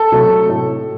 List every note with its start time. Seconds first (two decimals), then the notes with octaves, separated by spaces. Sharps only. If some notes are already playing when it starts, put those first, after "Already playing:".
Already playing: A4
0.12 C3 F#3 A3
0.49 A2 A3